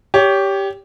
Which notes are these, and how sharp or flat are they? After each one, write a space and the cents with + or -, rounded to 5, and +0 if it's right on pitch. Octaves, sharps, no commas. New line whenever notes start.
G4 +0 C#5 +25